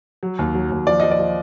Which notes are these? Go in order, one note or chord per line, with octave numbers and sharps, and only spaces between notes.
F#3
D#2
F#3
D#2
F3 D5
F3 D#5
D5
F3